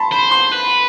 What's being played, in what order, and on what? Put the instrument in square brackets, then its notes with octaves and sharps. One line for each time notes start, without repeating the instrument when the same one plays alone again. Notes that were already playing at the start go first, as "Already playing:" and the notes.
Already playing: [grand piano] A5 B5 C6
[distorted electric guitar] C5 [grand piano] B5
[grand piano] C6
[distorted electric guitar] B4